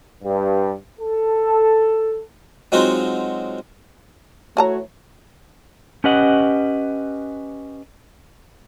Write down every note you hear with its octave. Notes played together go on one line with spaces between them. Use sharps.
G2
A4
F#3 G#3 C4 D#4 F4 F#4
E3 A3 F#4 C#5 A5 A#5
C#4 G4 B4 D#5 F#5